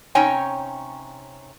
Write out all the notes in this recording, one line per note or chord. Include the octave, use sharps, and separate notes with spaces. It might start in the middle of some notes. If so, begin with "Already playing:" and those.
C3 C#4 D#4 C#5 G5 G#5